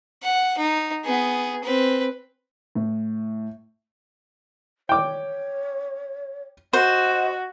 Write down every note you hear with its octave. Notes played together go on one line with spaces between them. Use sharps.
F#5
D#4
B3 G#4
C4 B4
A2
C#5 G5 D6
F#4 C5 D#5